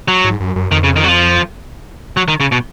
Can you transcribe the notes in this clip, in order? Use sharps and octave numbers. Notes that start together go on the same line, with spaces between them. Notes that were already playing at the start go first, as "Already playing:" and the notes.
F#3
G#2
F#2
F#2
F2 D#3
C#3
D#3
F#3
F3
F#3
D#3
C#3
B2